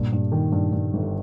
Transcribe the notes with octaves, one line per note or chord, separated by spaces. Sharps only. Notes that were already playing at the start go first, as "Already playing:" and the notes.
Already playing: G2 A#2 A#3
G2
D#3
G2
G2
G1